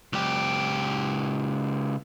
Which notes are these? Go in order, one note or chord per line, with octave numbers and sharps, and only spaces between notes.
C#2 G4